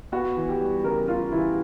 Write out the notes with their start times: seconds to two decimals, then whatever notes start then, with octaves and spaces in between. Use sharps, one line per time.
0.12 B3 F#4
0.36 E3
0.49 G4
0.61 G3
0.84 C#3 A#4
1.08 B3 F4
1.32 E3 E4